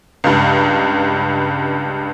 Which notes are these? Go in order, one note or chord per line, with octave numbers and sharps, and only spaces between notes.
C#2 G2